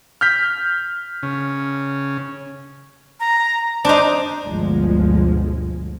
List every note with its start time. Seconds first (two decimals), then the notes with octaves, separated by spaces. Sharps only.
0.21 F6 G6 B6
1.23 C#3
3.20 A#5
3.85 D4 D#4 C5
4.46 G1 D2 B2 F3 G#3